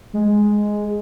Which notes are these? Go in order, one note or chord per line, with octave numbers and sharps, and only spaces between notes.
G#3